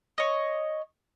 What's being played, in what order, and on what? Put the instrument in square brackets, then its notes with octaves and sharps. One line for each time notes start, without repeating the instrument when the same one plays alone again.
[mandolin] C#5 D#5